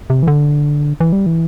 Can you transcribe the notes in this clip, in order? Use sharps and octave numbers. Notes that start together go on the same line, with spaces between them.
C3
E3
D3
E3
G3
E3